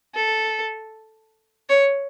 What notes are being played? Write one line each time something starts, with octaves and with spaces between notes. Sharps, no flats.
A4
C#5